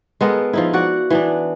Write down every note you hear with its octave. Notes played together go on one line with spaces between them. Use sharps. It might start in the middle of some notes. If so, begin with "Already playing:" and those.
G#3 B3 A4 A#4
F3 D#4 E4
F#4 D5 F#5
E3 B3 D4